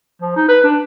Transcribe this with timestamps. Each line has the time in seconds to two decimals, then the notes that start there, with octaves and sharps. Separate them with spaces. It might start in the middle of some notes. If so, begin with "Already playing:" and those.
0.22 F3
0.36 D#4
0.49 B4
0.64 D4